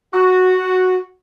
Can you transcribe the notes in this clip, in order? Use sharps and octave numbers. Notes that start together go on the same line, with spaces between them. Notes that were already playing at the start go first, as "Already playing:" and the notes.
F#4